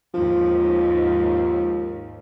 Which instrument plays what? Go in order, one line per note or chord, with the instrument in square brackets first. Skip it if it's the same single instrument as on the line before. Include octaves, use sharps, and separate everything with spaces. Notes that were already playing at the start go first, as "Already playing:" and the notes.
[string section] D#2 G#2 [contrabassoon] F3